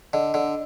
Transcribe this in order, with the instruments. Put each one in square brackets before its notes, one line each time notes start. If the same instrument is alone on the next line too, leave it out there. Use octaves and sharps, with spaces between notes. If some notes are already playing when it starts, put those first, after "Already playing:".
[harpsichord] D3 [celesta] D#5
[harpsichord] D3